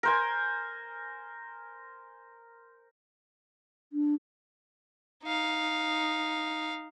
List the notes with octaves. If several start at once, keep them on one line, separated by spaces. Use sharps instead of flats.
A#4 C5 G#5
D4
D#4 F5